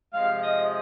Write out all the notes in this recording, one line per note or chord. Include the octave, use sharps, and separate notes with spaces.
C3 F3 G#3 F5
D#5